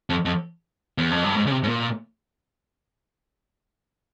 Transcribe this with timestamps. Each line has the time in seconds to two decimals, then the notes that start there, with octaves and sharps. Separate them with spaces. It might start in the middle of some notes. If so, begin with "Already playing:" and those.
0.10 F2
0.25 F2
0.98 E2
1.11 F2
1.24 G2
1.36 G#2
1.47 C#3
1.51 C3
1.64 G#2
1.67 A#2